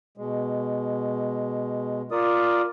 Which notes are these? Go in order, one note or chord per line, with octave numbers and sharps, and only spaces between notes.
B2 G#3
F4 A#4 D5 D#6